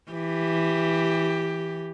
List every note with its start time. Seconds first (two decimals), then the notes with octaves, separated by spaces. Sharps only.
0.11 E3 G4